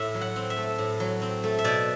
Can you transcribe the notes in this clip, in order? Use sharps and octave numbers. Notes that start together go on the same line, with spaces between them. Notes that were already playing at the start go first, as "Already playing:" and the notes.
Already playing: A2 E5
F#3
F#5
C4
E5
A3
A2
F#3
C4
A3
E5
B2 D5